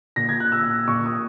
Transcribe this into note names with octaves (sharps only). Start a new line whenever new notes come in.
A#2 A#6
G#6
F#6
E6
A#2 C#6
D#6